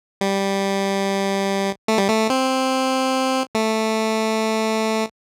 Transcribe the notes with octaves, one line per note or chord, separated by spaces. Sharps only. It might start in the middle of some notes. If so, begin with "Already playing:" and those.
G3
A3
G3
A3
C4
A3